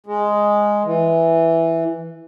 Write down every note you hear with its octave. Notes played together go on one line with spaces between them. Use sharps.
G#3
E3